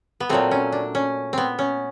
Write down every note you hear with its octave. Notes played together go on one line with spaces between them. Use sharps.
B3
A#2 F#3 A3 C4
C#4
D4
C#4
B3 C4
C#4